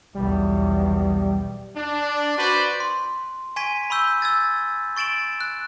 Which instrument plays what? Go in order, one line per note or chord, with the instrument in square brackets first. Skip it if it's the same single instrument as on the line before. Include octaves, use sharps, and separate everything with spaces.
[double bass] B1 E2 [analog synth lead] G3
[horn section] D4
F#4 B4 C5 D5
[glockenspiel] C6
G#5 C#6 G#6 B6 D#7
B5 C#6 E6 G6
E6 G#6 A6
C#6 A6 D7 E7 F#7
F#6